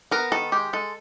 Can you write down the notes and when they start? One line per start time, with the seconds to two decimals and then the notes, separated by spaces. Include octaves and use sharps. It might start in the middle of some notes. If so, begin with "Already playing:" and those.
0.11 B3 A#4
0.32 D#3 A4
0.52 G#3 G4
0.73 G#3 A4